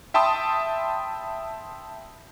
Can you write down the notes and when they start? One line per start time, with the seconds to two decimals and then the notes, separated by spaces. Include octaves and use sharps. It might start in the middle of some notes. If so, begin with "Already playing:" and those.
0.14 E5 G5 A5 B5 C6 D#6